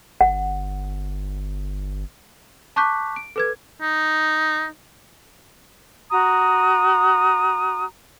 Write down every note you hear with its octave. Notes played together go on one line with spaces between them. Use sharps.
G1 F#5
A5 C#6 D6 F#6 G6 B6
D7
A4 B4 G#6
D#4
F#4 A#5 D#6